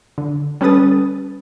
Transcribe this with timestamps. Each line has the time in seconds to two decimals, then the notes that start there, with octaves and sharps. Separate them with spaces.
0.18 D3
0.61 G3 C#4 A4 B4 D#6 A6